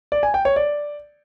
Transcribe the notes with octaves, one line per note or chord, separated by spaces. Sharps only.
D5
G#5
G5
C#5
D5